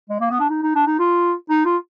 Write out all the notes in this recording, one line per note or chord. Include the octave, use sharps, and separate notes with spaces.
G#3
A#3
B3
D4
D#4
D#4
D4
D#4
F4
D#4
F4